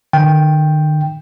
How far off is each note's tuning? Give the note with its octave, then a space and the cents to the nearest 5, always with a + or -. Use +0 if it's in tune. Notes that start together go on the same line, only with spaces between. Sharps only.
D#3 -45 G5 +0